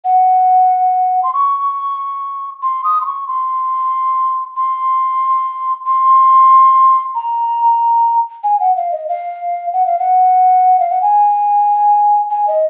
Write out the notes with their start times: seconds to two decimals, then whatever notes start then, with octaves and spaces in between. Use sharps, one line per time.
0.05 F#5
1.23 C6
1.34 C#6
2.62 C6
2.84 D#6
3.01 C6
3.06 C#6
3.28 C6
4.57 C6
5.86 C6
7.15 A#5
8.44 G#5
8.60 F#5
8.77 F5
8.92 D#5
9.08 F5
9.73 F#5
9.86 F5
9.99 F#5
10.80 F5
10.90 F#5
11.02 G#5
12.31 G#5
12.47 D#5